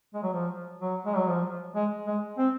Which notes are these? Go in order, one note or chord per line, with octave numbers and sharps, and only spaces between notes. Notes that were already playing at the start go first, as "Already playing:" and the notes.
G#3
F#3
F3
F#3
G#3
F#3
F3
G#3
G#3
C4